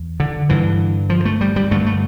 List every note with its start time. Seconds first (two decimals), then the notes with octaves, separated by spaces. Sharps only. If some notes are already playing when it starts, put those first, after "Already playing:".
Already playing: E2
0.20 D3
0.49 G2 D3 E3
1.10 F3
1.25 A3
1.41 G3
1.56 G3
1.71 G2 D3 A3
1.86 A3